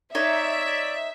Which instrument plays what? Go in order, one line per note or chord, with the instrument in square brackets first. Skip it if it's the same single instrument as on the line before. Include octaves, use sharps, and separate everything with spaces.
[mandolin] D#4 C#5 [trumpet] D5 [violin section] E5
[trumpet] D5